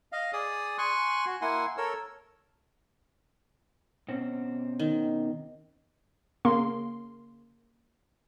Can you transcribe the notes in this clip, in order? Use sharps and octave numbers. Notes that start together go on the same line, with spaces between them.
D#5 F5
G#4 D5 D#6
G#5 C6 C#6 F#6
F#4
A#3 E4 F#5 G#5 C6
A4 A#4 C#5 E6
B2 C4 C#4
D#3
C#3 A#3 C6